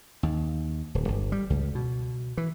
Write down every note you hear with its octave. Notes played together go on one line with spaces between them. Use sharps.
D#2
D1
G1
G3
C#2
B2
E3